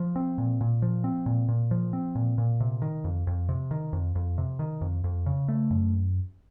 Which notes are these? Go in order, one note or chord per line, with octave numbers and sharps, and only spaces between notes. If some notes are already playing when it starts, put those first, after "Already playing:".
Already playing: F3
C4
A#2
A#2
F3
C4
A#2
A#2
F3
C4
A#2
A#2
C3
D#3
F2
F2
C3
D#3
F2
F2
C3
D#3
F2
F2
C#3
A3
F#2